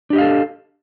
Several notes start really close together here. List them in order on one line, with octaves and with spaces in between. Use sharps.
D4 G4 D#5 F5 A4